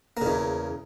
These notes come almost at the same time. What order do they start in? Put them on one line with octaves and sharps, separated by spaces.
A#3 C#3 E2